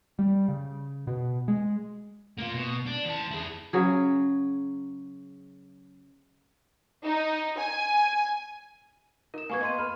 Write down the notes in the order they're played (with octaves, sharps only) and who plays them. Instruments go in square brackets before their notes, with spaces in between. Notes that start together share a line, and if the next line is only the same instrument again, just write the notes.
[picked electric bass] G3
C#3
B2
G#3
[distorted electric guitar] A#3 F4
B2
D4
E3 A5
E4 G#4
[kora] C#3 F#3 G#4
[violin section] D#4
G#5
[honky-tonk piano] D#4 [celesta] A#4 E7
[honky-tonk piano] A#3 B3 [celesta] G#5 C#6 G#6
[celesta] D#5 C6 D#7
[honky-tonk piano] B4 B5 F6